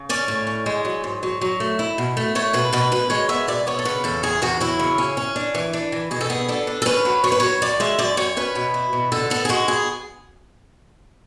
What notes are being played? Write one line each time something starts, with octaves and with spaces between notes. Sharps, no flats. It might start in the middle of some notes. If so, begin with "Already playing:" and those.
Already playing: C#3
C#4 D5
A2
C#4
G#3
F#3
G#2
F#3
F#3
A3
E4
B2
A3
A3 C#5
B2 B4
B2 B4
B2 B4
G#3 C#5
B3 E5
B2 D5
B3 C#5
A4
C#3 B4
E2 A4
E2 G#4
E2 F#4
F#3 E4
C#3
C#4
C#4
D4
E3
D4
E3
B2 G#4
A4
B3 G#4
D4 A4
D4
A4
C#4 B4
F#3
F#3 C#5
B4
F#3 C#5
F#2 D5
G#3 E5
F#2 D5
F#2 C#5
C#4 B4
B2
E4
B2
D3 A4
B3 A4
G#4
G#3 F#4
B3 G#4